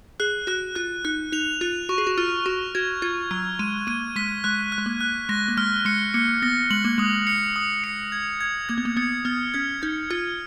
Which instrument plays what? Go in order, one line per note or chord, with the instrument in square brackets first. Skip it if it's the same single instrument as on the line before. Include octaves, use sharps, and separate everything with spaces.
[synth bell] G#4 [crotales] F#6
[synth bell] F#4 [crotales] F#6
[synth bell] F4 [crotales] F#6
[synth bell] D#4 [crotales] F#6
[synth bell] D#4 [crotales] F7
[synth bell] F4 [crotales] F#6
[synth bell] F#4 [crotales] C#6
[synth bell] G#4
F#4
[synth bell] F4 [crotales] F6
[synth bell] F#4 [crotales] C#6
[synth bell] F#4 [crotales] G#6
[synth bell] F4 [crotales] G#6
[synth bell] F#3 [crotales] F6
[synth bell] G#3 [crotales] D#7
[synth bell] A#3 [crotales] D#7
[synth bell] G#3 [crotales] B6
[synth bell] G#3 [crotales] F#6
[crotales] F#6
[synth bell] G#3
A#3
[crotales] F#6
[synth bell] G#3 [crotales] A#6
[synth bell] A#3
[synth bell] G#3 [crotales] F6
[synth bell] G#3 [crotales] C#7
[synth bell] A#3 [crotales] C#7
[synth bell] B3 [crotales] A#6
[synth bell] G#3 [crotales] F#7
[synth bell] A#3
[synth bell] G#3 [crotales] D#6
[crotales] C#7
D#6
C#7
G#6
G#6
[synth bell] A#3 [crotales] G#6
[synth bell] B3
A#3
[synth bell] B3 [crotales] C#7
[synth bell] B3 [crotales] F6
[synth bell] C#4 [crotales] G#6
[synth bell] D#4 [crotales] G#6
[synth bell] F4 [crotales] F6